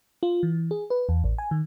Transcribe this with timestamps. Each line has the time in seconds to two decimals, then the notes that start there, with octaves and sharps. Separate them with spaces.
0.23 F4
0.43 E3
0.71 G#4
0.90 B4
1.09 E2
1.24 A1
1.38 G#5
1.51 D#3